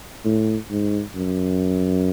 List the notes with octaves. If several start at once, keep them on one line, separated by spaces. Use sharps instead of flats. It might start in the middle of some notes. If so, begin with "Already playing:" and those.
A2
G#2
F#2